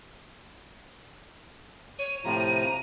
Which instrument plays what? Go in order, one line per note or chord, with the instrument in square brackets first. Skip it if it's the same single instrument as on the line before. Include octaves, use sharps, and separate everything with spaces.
[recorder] C#5 [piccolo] D#7
[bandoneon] A2 C3 F3 [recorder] A#5